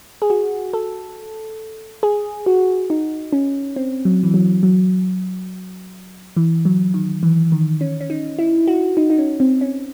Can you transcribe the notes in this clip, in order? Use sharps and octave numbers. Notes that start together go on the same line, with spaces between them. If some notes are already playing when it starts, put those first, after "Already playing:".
G#4
F#4
A4
G#4
F#4
D#4
C#4
C4
F#3
E3
F#3
F#3
E3
F#3
D#3
E3
D#3
C#4
C#4
D#4
E4
F#4
D#4
D#4
C#4
C4
C#4